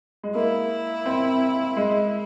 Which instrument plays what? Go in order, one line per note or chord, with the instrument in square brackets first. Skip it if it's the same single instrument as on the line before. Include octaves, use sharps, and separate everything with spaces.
[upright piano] G#3
[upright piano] A#3 [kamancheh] E4
[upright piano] C4
G#3